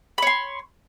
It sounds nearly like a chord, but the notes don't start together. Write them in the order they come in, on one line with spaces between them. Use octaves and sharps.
B5 C#5 C6